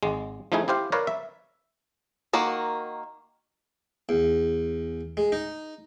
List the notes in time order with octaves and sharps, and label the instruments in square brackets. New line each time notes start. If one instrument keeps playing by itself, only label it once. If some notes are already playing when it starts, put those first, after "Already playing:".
[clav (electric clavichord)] G#1 G#3
F3 A3 D#4 E4 G#4
E4 G4 C5 F5
A#4 B4 C#5 D5 F5
E5
[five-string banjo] D#3 A#3 F#4
[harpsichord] E2
G#3
D#4